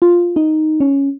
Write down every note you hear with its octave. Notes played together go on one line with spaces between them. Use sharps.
F4
D#4
C#4